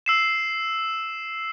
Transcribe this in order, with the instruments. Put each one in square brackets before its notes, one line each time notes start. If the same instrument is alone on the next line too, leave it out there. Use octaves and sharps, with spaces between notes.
[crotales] E6 C7 E7